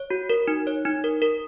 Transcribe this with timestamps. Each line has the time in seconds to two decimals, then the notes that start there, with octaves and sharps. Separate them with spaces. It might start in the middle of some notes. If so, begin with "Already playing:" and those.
Already playing: C#5
0.10 F#4
0.30 A#4
0.48 D#4
0.67 C#5
0.85 D#4
1.04 A#4
1.22 A#4